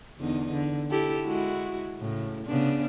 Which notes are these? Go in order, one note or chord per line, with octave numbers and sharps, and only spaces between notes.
E2 D3 D#4
D3
E4 G4 A4
G#3 E4 F#4
A2 C#3
C#3 B3 D4